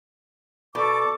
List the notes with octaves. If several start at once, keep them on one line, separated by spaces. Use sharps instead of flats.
B2 A4 D5 D6